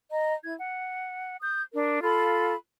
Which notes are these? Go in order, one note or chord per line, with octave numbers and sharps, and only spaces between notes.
D#5 A#5
E4 G#6
F#5
D#6 G6
D4 A#4
F4 A4 F5 B5